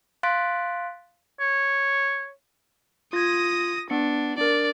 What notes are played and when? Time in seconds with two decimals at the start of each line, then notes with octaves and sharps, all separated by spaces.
0.23 F5 C6 F#6 A6 B6 D7
1.40 C#5
3.13 F4 D#6 G#6 A#6
3.90 B3 D4 C#7
4.38 D4 A#4 D5